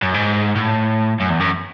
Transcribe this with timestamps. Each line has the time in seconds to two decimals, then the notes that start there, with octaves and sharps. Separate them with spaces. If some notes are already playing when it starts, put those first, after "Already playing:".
0.03 F#2
0.14 G#2
0.56 A2
1.20 F#2
1.30 E2
1.40 F#2